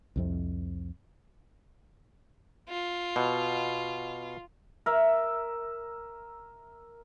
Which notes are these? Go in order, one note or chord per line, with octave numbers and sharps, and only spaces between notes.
C2 F2 C3
F4
B2
A#4 E5